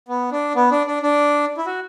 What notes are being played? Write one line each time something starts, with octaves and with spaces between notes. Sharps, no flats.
B3
D4
B3
D4
D4
D4
E4
F#4